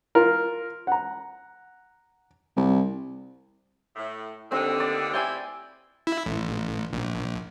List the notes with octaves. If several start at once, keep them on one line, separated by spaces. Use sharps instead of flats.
F4 A#4
F#5 A#5
C2
A2
D#2 D3 C4
D5
C4 E4 G4 D5 G#5 D6
E4
A1
A#1